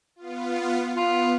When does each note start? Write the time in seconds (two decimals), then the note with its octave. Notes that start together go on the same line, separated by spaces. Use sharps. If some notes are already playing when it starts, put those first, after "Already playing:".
0.16 B3 F4
0.97 B3 F4